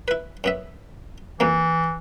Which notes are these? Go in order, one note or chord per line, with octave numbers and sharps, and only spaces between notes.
E4 B4
F#2 B3 E5
F2 B2 E3 A#3